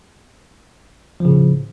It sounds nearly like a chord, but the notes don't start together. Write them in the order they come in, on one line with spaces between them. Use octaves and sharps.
F3 C#3 A2